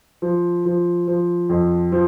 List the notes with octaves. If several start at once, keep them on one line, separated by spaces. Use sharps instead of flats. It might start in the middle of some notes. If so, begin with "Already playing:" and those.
F3
F3
F3
F2
F3